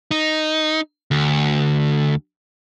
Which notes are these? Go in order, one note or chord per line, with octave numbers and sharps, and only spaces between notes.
D#4
D2